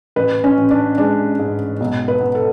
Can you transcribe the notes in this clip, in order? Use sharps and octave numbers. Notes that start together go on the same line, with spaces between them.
A1 B4
C#4
A1
D4
G#3 D4
G#2
B1
B4
B3
A4